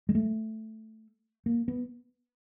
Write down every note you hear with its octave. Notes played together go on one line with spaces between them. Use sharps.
G#3
A3
A#3
B3